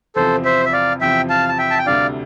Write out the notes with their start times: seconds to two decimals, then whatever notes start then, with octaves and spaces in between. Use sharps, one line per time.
0.16 E2 C3 F3 C4 A4 C5
0.45 C5 E5
0.65 E5
0.73 D5 F5
1.01 E2 C3 F3 C4 E5 G5
1.30 F5 A5
1.49 A5
1.58 E5 G5
1.71 A5
1.79 G5
1.86 D2 C3 G3 D4 D5 F5